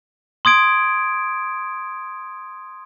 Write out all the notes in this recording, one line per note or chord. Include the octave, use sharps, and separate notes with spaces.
C6 D#6 G#6 D7